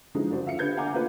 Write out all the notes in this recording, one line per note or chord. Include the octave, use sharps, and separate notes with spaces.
D3 E3 F3 G#3 D#4
F#1 G2 D4 F#4 C5
F4 E5 F5 C#7
D3 G4 B4 G6 G#6
D4 F5 F#5 G#5 A#5 D6
A3 A#3 D4 F4 B4